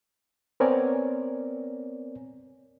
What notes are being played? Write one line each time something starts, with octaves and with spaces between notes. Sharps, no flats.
B3 C4 A#4 C#5 D5 G#5